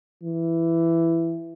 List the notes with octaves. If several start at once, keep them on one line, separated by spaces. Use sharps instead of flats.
E3